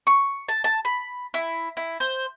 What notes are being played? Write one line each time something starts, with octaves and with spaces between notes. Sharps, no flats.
C#6
A5
A5
B5
E4
E4
C5